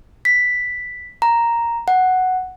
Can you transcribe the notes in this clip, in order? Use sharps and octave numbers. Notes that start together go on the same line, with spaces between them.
B6
A#5
F#5